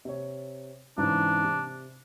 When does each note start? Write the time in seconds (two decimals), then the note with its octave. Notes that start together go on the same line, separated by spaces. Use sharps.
0.05 C3 C#5
0.98 G#2 C#3 E3 D4
1.44 C3